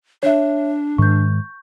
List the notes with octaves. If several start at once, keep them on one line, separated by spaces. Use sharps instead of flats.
D4 C#5 E5
G#2 D#3 C#6 G6